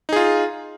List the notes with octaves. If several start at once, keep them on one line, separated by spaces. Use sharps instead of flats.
D#4 F4 G#4